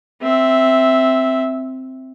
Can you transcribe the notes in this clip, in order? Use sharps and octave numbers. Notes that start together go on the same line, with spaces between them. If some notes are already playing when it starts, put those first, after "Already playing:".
C4 E5